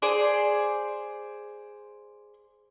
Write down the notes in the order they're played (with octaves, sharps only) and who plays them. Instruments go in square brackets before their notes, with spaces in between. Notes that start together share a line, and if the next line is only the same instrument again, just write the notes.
[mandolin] G#4 C5 D5